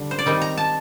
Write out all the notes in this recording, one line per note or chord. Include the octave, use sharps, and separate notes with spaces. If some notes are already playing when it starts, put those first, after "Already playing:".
Already playing: D3 G3
C5
D5
D#3 G3 C4 D#4 D#5
A#5
A5